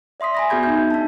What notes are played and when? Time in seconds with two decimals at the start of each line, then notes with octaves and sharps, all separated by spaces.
0.20 D5 E5 C6 D#6 B6
0.35 G#5 B5 A#6
0.50 B3 F#4 G#4 G6 G#6
0.63 D#4 E5 G6
0.91 D4 A5